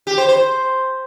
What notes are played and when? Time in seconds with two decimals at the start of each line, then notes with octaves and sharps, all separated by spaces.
0.07 G4
0.18 C5
0.29 C5